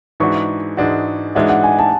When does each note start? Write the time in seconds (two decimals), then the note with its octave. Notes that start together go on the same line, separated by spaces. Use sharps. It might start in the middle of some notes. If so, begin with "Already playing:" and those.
0.20 G#2 E3 G#3 D4 F#4 C#6
0.77 G#2 E3 G#3 D4 F#4
1.35 G#2 E3 G#3 D4 F#4 E5
1.49 F#5
1.64 G#5
1.79 A5